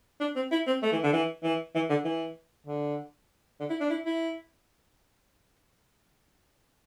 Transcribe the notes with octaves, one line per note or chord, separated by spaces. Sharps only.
D4
C4
E4
C4
A3
E3
D3
E3
E3
E3
D3
E3
D3
D3
E4
D4
E4
E4